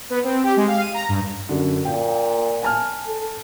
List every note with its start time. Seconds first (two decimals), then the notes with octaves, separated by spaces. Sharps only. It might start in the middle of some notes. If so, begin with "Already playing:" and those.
0.10 B3
0.24 C4
0.43 G4
0.56 G#3
0.68 F5
0.81 D#7
0.94 A#5
1.09 G2
1.49 F#2 D3
1.85 A#2 G5
2.63 G#5 A5 F6
3.07 A4